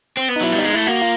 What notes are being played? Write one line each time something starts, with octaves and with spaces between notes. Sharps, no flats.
C4
B3
D#4
F#3 E4
G3
D#4
G#3
A3 E4
A#3 F#4
F4